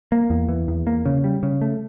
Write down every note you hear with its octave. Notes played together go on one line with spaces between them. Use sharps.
A#3
E2
E3
E2
A#3
C#3
G3
C#3
A3